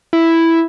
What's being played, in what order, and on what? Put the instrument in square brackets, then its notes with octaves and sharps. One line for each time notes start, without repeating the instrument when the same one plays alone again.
[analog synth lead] E4